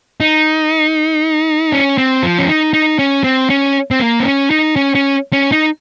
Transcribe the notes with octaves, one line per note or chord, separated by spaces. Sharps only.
D#4
C#4
C4
F3
C#4
D#4
D#4
C#4
C4
C#4
C4
A#3
C4
C#4
D#4
C#4
C#4
C#4
D#4